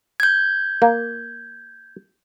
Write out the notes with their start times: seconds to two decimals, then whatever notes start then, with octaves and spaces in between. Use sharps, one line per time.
0.20 G6 G#6
0.82 A#3